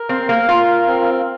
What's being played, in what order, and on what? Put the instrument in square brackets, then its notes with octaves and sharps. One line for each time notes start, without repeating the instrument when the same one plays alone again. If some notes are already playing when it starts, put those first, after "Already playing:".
Already playing: [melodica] A#4
[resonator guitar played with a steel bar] C4 [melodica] F5
[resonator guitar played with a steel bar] A#3
[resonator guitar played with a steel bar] F4 [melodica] A#4
[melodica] C4